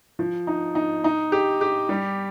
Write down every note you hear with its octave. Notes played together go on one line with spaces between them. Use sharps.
F3
D#4
D#4
D#4
G4
G4
G3